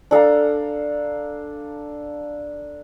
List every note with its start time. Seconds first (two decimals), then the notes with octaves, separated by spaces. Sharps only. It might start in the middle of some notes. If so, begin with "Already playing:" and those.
0.11 D4 A4 F5 A#5